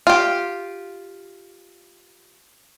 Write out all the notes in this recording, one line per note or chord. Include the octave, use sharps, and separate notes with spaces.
F4 G4